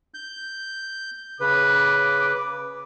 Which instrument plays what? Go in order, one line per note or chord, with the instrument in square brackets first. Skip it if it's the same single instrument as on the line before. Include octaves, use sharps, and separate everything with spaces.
[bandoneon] G6
[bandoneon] C#3 B4 [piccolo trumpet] D6